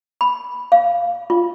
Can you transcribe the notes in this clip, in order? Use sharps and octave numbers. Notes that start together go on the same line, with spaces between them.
B5
F5
F4